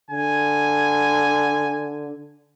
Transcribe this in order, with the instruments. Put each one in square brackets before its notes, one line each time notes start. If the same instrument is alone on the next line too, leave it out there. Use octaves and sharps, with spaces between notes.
[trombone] D3 [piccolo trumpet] G#5